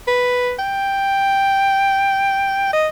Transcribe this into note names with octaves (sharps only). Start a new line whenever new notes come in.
B4
G5
D#5